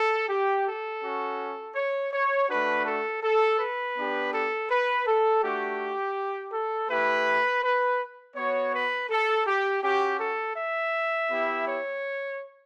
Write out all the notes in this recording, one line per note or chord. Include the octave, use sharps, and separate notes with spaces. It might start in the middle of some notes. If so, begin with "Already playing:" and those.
Already playing: A4
G4
A4
C#4 F#4
C#5
C#5
A3 D4 F#4 B4
A4
A4
B4
B3 D4 G4
A4
B4
A4
A3 D4 F#4 G4
A4
A3 E4 G4 B4
B4
B3 F#4 C#5
B4
A4
G4
C#4 F#4 G4
A4
E5
B3 E4 G4
C#5